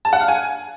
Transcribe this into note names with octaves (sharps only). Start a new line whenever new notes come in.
A5
F#5
F5
G#5